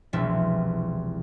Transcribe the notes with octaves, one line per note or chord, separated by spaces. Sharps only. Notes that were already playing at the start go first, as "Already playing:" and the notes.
E1 C2 F3 E5